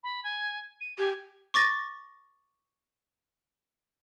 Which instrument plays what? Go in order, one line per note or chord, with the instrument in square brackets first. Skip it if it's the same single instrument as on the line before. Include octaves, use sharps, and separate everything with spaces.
[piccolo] B5
G#5
D#7
[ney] G4 [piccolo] G#5
[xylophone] C#6 D6 A6 A#6